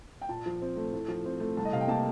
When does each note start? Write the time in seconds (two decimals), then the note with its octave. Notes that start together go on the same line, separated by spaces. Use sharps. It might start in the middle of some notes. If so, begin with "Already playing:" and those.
0.21 G5
0.29 A#2 A5
0.46 F3
0.62 C4
0.76 A3
0.92 A2
1.08 F3
1.25 C4
1.40 A3
1.57 C2 A5
1.65 D#5
1.73 C3 F5
1.81 G5
1.88 A#3 A5